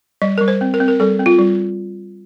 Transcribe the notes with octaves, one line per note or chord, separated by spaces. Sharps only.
G3 D#5
G3 A#4
C5
C4
A#4
C4
A#4
G3 A4
C4
F4
G3